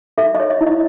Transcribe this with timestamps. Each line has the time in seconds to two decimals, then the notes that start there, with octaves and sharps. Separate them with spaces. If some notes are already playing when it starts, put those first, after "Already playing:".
0.18 A4 E5
0.35 D#5
0.40 C#5
0.50 D#5
0.61 E4
0.67 D#5